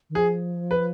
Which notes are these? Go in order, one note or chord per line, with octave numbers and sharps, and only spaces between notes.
D#3
F3 G#4
B4